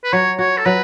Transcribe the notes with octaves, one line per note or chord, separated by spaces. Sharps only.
B4
F#3 C#5
F#4 C#5
A4
F#3 B4